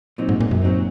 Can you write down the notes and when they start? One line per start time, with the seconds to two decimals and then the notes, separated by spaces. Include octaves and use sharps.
0.18 A#2 F#3 C4 D#4
0.29 G#2
0.40 A#2
0.51 F#2
0.62 A#2 F#3 C4 D#4